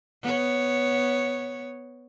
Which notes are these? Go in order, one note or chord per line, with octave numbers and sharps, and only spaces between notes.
B3 C#5